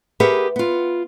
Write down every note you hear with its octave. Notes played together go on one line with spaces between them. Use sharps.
G4 G#4 A#4 B4 E5 F#5
B3 F4